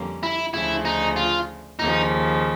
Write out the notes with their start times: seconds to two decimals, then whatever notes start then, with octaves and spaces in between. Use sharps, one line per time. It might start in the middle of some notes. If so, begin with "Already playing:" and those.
Already playing: F2 D3 G3 A#3 C#4
0.23 E4
0.54 D2 C#3 F3 E4
0.85 D#4
1.16 F4
1.78 D#2 C#3 F3 D#4